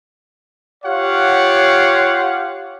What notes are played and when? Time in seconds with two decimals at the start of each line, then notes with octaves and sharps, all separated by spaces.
0.84 F4 G4 C#5 F5 F#5